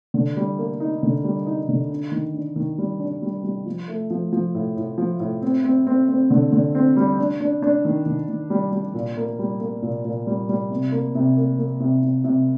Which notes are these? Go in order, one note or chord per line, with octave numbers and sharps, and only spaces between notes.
D3
G3
A#3
D#4
D3
G3
D#4
D3
D4
D#3
D4
D#3
G3
D4
G3
G3
F3
A3
F3
F3
A2
A2
F3
A2
C4
C4
C4
C4
D3
D3
C4
G3
D4
D4
D4
D#3
D#3
D#3
G3
G3
A#2
A#3
G3
A#3
A#2
A#2
G3
G3
C3
A#3
C3
A#3
A#3
C3
C3
C3